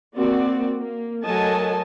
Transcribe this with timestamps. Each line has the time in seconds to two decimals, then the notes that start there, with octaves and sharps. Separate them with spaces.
0.16 A#3 C4 F#4 D5
0.78 A#3
1.24 F#3 A3 A#4 D#5 G#5 A5